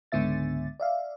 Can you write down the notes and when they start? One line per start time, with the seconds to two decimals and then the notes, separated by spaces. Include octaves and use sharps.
0.12 C#2 G#2 D3 B3 E5 A6
0.80 D5 E5 F5